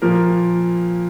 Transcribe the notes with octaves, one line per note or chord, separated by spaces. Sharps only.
A#2 F3 A#3 A#4